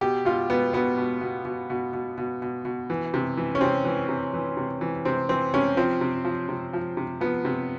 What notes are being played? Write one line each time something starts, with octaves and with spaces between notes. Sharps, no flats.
B2 G4
B2 F4
B2 B3
B2 B3
B2
B2
B2
B2
B2
B2
B2
B2
E3
C3
E3
C#4
C3 C4
E3
C3
E3
C3
E3
C3 C4
E3 C4
C3 C#4
F3 C4
C3
F3
C3
F3
C3
F3 B3
C3